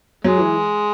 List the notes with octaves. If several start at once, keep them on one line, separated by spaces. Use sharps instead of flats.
F#3 G#3
E3